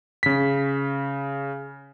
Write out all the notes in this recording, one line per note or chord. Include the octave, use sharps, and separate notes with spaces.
C#3 B6